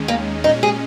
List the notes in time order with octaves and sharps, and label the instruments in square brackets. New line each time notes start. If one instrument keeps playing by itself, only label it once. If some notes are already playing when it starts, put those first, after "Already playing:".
Already playing: [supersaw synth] D#2 D#3 G#3 C#4
[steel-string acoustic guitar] A#3
[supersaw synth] A#2 G#3 C#4 [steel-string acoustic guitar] D#4
[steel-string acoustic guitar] G#4